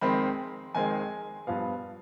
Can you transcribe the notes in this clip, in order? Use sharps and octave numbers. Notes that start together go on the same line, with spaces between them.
F2 D#3 G#3 C4 B5
F2 D#3 G#3 C4 G#5
G2 F3 B3 F5